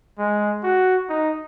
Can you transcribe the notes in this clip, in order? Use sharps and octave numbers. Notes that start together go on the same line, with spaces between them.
G#3
F#4
D#4